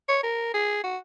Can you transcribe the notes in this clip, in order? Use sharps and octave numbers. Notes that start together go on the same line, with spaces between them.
C#5
A#4
G#4
F#4